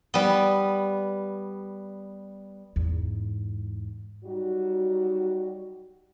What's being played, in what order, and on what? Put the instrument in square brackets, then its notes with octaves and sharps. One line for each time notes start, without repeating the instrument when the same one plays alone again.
[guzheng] G3 B3
[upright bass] E2 G#2
[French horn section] F#3 G3 D#4 F#4